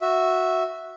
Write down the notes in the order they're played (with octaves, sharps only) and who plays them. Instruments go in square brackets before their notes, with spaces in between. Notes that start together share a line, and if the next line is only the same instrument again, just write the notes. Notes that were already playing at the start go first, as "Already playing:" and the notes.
[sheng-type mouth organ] F#4 E5